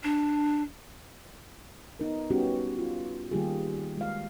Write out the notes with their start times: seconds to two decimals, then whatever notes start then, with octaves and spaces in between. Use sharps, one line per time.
0.03 D4
1.99 B3 D#4 A#4
2.30 G3 B3 C#4 D#4 F#4 G4
2.59 G4
2.79 F4
3.31 D#3 G3 A#3 F4 G4 G#4
3.98 G#3 F5